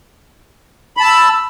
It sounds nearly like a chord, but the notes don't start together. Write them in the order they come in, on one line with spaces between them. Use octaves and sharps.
B5 A5 E6